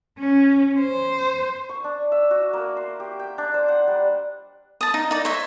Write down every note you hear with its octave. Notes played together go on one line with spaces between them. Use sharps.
C#4
C5
C#6
D4
E5
F#4
A#3
C6
G4
G5
D4
C5
F#5
G3
A5 D#6
D#4
D#4 D5
C5 C#5 E5